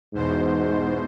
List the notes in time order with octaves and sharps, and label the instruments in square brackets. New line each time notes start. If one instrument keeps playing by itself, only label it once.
[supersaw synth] E2 B2 C5 [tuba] G#2